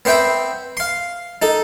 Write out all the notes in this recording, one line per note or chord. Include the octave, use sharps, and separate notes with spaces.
B3 C4 C5 E5 G5 B5
F5 C6
D#4 A4